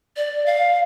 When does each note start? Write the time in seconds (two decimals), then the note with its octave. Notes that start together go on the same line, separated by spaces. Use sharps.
0.17 D5
0.46 F5